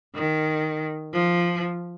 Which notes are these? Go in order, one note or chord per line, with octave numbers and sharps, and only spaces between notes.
D#3
F3